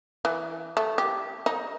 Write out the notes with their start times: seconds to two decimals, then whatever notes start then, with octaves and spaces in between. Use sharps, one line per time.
0.25 E3
0.77 A3
0.98 G4
1.46 D#4